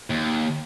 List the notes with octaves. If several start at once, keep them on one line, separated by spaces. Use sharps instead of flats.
D#2